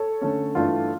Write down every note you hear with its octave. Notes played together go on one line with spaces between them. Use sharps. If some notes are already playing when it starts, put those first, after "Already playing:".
Already playing: A4 C#5
D3 A3 C#4
G2 E3 A3 D4 F4 A4